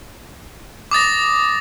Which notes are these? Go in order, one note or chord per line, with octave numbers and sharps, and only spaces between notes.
D6 D#6 A6 A#6